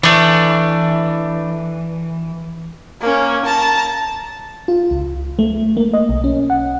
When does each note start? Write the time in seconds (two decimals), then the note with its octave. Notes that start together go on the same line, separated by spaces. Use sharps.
0.03 E3 A3 D4
3.01 A#3 C#4
3.45 A5 A#5
4.68 F4
4.91 C#2
5.39 A3
5.77 A#3
5.93 D#5
6.09 B1
6.24 C#4
6.50 F#5